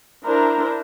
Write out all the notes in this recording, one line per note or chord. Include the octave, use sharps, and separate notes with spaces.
D4 E4 A#4 C5 A#5